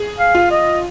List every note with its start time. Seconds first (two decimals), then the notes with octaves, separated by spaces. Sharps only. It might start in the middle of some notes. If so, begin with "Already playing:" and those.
Already playing: G#4
0.18 F5
0.35 F4
0.51 D#5